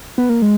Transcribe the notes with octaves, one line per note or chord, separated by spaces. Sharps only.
B3
A#3
G#3